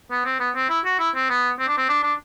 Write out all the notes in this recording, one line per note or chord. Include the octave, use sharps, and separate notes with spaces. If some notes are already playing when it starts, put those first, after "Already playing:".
B3
C4
B3
C4
E4
F#4
E4
C4
B3
C4
D4
C4
D4
D4